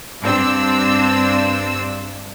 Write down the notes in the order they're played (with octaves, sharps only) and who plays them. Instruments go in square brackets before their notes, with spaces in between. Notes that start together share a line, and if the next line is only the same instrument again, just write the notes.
[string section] G2 C4 D4 E6